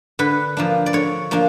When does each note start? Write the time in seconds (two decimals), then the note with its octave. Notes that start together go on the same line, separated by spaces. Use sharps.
0.19 D3 B4
0.57 F3 A#3 D4
0.86 D5
0.93 D3 C#5
1.31 F3 A#3 D4